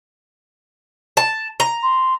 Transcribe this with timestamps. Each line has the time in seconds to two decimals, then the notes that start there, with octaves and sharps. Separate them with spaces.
1.17 A5
1.60 A#5
1.83 C6